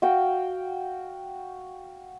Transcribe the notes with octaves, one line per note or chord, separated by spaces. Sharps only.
F#4 F5 G5